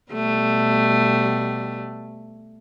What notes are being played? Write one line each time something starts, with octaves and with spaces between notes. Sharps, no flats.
B2 G3 A3